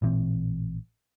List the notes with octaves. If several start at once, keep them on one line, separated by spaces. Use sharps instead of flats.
A1 A#2 E3 C4